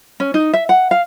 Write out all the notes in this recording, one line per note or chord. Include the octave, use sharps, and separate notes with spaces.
C#4
D#4
E5
F#5
F5